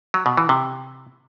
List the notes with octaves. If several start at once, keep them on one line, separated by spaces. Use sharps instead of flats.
F#3
B2
E3
C3